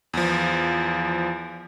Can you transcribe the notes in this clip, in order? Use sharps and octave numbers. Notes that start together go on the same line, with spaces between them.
E2 F3